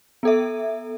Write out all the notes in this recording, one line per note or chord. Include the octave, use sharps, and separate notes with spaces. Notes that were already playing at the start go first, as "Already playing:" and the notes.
B3 A4 E5